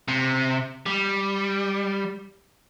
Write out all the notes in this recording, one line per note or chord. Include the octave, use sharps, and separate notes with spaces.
C3
G3